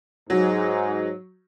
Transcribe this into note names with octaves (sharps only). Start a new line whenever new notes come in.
G#2 F#3